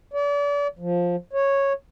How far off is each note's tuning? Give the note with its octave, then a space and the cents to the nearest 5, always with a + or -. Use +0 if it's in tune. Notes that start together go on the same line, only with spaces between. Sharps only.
D5 -35
F3 +10
C#5 -10